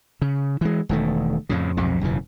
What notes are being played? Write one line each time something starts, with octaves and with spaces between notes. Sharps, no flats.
C#3
E3 G#3
E1 D#3 A3
F2 A2 C#3
B1 F2 G#2 C3
E1 F#2 C#3 E3